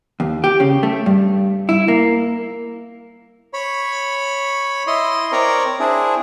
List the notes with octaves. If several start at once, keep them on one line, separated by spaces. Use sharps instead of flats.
D#2
G4
C#3
A3
G2
E4
A#3
C#5 B5
E4 D#5 C6
C4 A#4 C#5 D5 A#5
C4 D4 E4 G#4